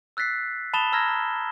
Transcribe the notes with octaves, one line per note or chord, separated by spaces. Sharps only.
E6 F#6 A6 B6 C7
A5 B5 D#6 A6 E7 G7
A5 A#5 E6 F6 G#6 A#6
A#6